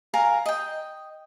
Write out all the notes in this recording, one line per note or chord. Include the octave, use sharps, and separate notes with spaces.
A#4 F5 G#5 A#5
D#5 G5